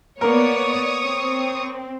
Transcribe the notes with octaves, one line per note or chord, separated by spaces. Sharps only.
A#3 B3 A#4 C#5 D5 C#6 D#6
C4